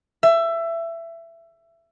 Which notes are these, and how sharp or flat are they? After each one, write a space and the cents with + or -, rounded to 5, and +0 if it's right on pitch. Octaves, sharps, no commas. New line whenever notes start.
E5 +20